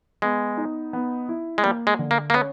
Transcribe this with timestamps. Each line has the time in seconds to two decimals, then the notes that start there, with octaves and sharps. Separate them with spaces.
0.22 G#3 B3
0.57 D#4
0.93 B3
1.29 E4
1.58 G#3
1.64 G3 A#3
1.87 G#3
1.99 D3
2.11 A#3
2.30 A#3
2.34 B3 C#4